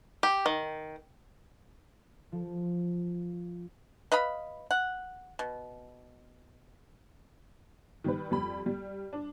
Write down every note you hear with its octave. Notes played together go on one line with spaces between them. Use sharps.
G4
D#3
F3
B4 D#5 F5 B5
F#5
B2
D#3 G3 B4
F2 G3 B5
G3
D4